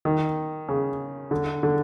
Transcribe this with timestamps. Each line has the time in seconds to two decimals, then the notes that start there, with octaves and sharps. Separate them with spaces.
0.05 D#3
0.69 C#3
1.31 D3
1.63 D3